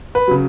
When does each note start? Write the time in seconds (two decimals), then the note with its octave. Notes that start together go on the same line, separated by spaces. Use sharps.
0.15 B4
0.28 C#3 F#3